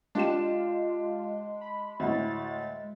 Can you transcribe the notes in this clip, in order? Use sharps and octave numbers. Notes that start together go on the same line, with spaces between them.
G#3 D4 F4 G4 E7
B5
D2 A2 A6